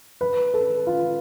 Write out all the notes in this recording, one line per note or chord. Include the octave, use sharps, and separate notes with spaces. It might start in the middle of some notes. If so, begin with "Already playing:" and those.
B4
A4
F4